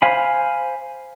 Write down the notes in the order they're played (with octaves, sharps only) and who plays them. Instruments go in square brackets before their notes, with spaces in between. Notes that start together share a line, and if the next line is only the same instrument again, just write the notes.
[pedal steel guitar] C5 F5 G#5 B5